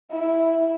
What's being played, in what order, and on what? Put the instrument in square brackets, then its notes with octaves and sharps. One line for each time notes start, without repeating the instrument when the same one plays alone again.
[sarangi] E4